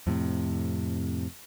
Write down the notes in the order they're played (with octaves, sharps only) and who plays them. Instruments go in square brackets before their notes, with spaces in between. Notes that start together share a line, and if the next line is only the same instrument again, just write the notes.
[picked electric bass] F2 A2 C3